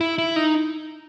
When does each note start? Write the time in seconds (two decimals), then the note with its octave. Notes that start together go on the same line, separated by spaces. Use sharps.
0.01 E4
0.18 E4
0.36 D#4